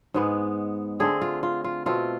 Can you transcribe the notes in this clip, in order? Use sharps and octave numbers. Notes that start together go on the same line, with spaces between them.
G#2 G#3 B3
D3 A3 C4 G#4
F4
F4
F4
B2 A3 C4 F4